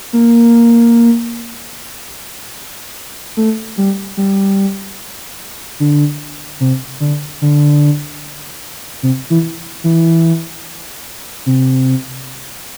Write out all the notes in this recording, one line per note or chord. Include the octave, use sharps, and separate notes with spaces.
A#3
A3
G3
G3
D3
C3
D3
D3
C3
E3
E3
C3